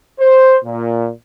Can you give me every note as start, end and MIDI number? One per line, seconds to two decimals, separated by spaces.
0.20 0.57 72
0.64 1.10 46